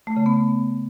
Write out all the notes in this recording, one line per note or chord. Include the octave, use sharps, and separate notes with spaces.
A3
C#3
B3